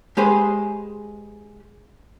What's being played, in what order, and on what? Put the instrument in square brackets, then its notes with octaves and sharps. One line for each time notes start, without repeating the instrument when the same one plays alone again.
[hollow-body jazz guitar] G#3 G4 G#4 B4 C5